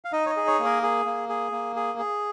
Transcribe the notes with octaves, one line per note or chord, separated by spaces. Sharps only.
F5
D#4 D#5
C#5
D#5
G#4
C#5
A#3
A#4
G#4
A#3
G#4
A#3
G#4
G#4